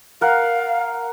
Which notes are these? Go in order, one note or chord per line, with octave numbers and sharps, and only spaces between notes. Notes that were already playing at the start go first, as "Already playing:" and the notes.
A#4 F5 F#5